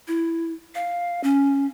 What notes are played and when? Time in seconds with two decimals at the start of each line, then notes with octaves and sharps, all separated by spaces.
0.08 E4
0.75 F5
1.24 C#4